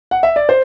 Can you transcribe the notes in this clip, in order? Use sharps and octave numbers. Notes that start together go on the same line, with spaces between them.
F#5
E5
D5
C5